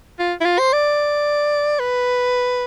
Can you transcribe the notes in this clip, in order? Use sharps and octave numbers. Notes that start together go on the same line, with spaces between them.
F4
E4
F4
C5
D5
B4